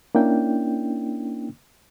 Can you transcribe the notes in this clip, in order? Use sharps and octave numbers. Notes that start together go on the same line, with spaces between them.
A#3 C#4 D4 E4 G5